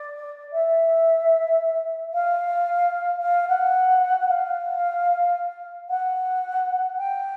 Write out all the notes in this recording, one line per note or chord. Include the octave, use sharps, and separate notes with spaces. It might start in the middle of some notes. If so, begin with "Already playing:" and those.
Already playing: D5
E5
F5
F5
F#5
F#5
F5
F#5
G5